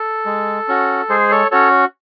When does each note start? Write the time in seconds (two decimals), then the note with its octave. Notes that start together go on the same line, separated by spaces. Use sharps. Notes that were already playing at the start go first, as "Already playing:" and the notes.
Already playing: A4
0.26 G#3
0.68 C#4 F#4
1.09 G#3 G#4 C5
1.31 A4 C#5
1.51 C#4 F#4 A4 C#5